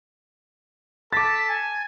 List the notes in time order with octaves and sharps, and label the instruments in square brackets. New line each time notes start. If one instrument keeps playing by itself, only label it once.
[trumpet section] A4 A5 [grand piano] D6 A6 [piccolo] B6
[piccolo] G#5